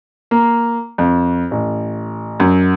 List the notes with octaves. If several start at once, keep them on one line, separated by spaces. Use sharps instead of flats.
A#3
F2
A1
F#2